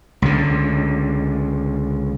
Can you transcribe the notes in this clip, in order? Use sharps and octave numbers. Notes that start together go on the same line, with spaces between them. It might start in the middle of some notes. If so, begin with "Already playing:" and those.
C#2 D3